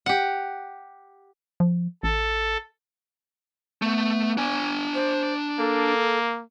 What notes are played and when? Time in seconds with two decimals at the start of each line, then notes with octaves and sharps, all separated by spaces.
0.06 G4 F#5
1.60 F3
2.03 A1 A4
3.82 A3 B3
4.37 D4 G#5
4.95 C5
5.59 A#3 A4